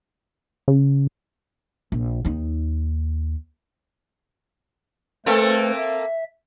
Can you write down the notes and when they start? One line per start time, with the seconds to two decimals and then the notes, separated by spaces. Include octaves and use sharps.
0.68 C#3
1.92 A#1
2.25 D#2 D#4
5.26 A3 A#3 C4 A4 B4 C5
5.76 E5